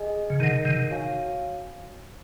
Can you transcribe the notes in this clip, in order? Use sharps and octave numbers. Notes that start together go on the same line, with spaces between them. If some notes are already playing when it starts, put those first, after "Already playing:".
Already playing: G#4 D#5 G#5
C#3
C3 D#3 D#4 A#4 D#5 F#5
C3 D#3
F#4 C#5 F5 G#5